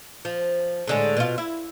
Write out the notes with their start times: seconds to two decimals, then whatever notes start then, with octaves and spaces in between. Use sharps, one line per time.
0.25 F3
0.88 A2 D3 G#3
1.17 B2 F4
1.38 E4